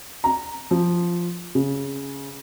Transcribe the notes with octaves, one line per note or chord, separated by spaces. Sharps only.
A#5
F3
C#3